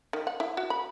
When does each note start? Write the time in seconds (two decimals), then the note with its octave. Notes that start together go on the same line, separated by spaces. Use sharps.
0.13 D#3
0.27 F#5
0.40 E4
0.57 F#4
0.70 B5